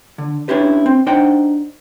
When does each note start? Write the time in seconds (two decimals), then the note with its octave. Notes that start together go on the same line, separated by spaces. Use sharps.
0.18 D3
0.48 C#4 D4 E4 G4 B4
0.86 C4
1.07 D4 D#4 C5 D#5 F#5 G5